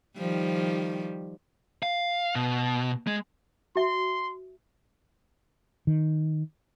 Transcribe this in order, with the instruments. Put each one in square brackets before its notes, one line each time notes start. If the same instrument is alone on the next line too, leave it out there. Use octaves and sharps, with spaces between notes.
[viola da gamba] D#3 F3 G3
[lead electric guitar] F5
B2
G#3
[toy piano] F#4 E5 [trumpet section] C6
[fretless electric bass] D#3